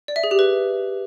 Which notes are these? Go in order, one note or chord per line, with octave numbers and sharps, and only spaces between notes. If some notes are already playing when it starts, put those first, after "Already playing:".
D5
E5
G#4
G4
B4